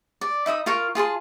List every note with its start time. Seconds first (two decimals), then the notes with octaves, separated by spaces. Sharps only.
0.21 D5
0.46 D#4 E5 B5 D#6
0.66 F4 A#4 F5 C#6
0.95 F4 G#4 A5 C6